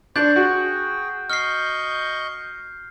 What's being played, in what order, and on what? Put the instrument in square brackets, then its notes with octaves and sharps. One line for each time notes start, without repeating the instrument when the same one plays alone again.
[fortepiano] D4 [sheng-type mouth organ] C5 C6 C#6 [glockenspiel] G6
[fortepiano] F#4 [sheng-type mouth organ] G#4 G5
[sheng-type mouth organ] D#5 C#6 G6 [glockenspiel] F6 C7